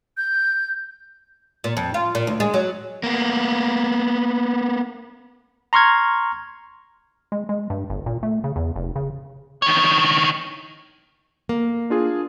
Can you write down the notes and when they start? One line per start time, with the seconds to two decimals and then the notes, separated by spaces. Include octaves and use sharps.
0.17 G6
1.64 A#2
1.77 F2
1.94 F4
2.15 A#2
2.27 D2
2.40 G#3
2.54 F#3
3.03 A#3 B3
5.73 A#5 C6 C#6 F6 G#6
7.32 G#3
7.49 G#3
7.70 G2
7.90 G1
8.06 A#2
8.23 A3
8.44 C#3
8.56 E2
8.76 F1
8.96 C#3
9.62 D#3 C#5
11.49 A#3
11.90 D4 F4 G#4